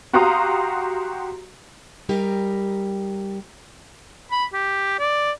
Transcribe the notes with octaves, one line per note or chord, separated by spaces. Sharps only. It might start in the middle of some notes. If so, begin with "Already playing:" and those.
F#4 G4 F5 A#5 C6 D#6
G3 D#4 G4 A#4
B5
G4
D5